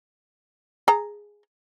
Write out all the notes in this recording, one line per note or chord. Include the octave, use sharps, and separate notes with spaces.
G#4 A#5